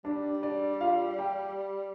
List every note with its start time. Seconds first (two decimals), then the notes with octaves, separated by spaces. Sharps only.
0.04 G3 D4
0.42 D4 D5
0.81 F4 F5
1.19 G4 G5